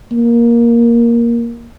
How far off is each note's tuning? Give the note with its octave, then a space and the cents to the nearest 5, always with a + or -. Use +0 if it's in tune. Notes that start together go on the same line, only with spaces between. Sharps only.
A#3 +10